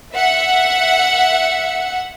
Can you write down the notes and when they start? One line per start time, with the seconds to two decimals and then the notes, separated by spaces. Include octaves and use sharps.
0.15 E5 F#5